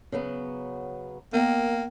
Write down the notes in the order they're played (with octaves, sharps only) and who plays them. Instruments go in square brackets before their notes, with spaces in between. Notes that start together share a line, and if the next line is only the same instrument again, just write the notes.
[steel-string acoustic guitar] C#3 F#3 B3
[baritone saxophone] A#3 [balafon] B3 [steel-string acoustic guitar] A#4 D#5 [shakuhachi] G5